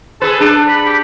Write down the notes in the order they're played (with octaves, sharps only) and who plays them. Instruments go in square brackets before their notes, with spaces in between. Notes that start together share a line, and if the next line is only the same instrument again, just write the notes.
[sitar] G#4 B4 [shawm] A4
[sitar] D4
[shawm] B5
G4